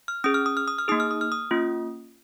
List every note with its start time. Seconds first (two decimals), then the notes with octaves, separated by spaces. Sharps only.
0.08 F6
0.24 C#4 G#4 D#6
0.34 F6
0.46 D#6
0.57 F6
0.68 D#6
0.78 F6
0.88 A#3 D#4 G#4 D#6
1.00 F6
1.11 D#6
1.21 F6
1.32 D#6
1.51 A#3 C#4 F4